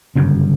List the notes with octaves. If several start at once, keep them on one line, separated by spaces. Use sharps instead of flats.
G1 F#2 C#3